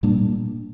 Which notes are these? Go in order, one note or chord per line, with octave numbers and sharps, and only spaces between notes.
A#2 G3 A#3 D4